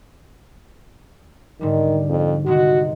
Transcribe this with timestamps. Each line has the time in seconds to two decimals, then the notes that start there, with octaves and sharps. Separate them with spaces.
1.61 G#2 D3 D#3 G3
2.09 F2
2.46 C3 D#3 G#3 F#4